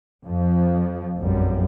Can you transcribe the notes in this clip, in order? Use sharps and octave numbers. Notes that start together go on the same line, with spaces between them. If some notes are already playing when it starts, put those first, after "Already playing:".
F2 F3
F1 A#1 F#2 G3